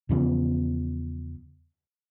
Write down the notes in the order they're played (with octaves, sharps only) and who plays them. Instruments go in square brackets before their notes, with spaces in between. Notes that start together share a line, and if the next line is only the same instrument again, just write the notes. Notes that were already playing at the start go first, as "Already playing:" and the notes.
[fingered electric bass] E2 C#3 F3 B3